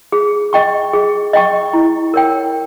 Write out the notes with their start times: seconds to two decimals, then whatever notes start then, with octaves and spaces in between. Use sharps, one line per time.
0.12 G#4
0.53 D#5 G5 C#6
0.93 G#4
1.33 D#5 G5 C#6
1.73 E4
2.14 A#4 C#5 G5